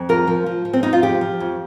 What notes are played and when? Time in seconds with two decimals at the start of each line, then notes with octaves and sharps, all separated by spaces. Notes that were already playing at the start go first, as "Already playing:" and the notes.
Already playing: F2
0.09 F3 A#4
0.27 F3
0.46 F3
0.65 F3
0.73 C4
0.83 F2 D#4
0.93 F4
1.03 F3 G4
1.21 F3
1.40 F2